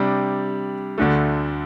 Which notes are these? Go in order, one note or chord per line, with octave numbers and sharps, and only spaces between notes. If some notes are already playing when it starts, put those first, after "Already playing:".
Already playing: C3 G3 D4
D2 D3 A3